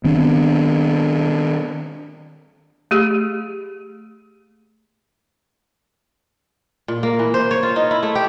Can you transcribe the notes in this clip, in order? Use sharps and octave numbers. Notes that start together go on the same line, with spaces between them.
D#3 B3 C4 D4
A3 G4 G#4
A#2
A#3
E3
C5
C#5
F4
D#4
E4
A3
G4